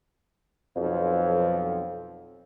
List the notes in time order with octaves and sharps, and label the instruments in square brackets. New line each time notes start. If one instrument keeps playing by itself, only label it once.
[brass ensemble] B1 F2